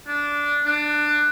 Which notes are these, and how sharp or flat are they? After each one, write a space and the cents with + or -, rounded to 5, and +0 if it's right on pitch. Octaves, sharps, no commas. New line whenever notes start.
D4 -10
D4 +20